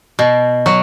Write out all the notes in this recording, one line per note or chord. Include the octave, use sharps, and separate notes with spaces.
B2
F#3